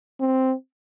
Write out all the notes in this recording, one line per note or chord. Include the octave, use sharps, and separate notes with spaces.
C4